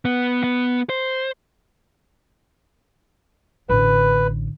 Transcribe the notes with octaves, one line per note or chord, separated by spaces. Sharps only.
B3
B3
C5
A1 D3 B4